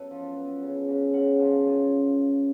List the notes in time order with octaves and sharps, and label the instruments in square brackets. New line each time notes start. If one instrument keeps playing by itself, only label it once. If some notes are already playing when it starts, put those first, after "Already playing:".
Already playing: [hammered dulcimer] F#2 B3 A4 B4
F3
B3
C#3
C#3
C#3 F#5
F3 G#5
F#2 G#5